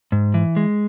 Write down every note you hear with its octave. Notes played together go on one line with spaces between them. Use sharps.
G#2
E3
G#3